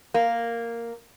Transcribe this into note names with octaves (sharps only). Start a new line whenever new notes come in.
A#3